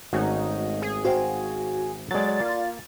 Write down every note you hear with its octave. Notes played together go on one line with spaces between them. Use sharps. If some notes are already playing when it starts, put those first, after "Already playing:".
G#1 A3 C#4 D#4 F#4 F#5
G#4
F#4 C5 F5 G5
F#3 G#3 A4 D5 A6
A#3 F4